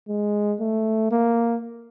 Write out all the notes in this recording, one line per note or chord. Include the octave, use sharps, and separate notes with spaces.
G#3
A3
A#3